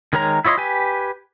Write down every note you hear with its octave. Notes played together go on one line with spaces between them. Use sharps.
D#3 G#3 A#4 C#5 A#5
E4 F4 C#5 D#5 C6
G4 B4 G#5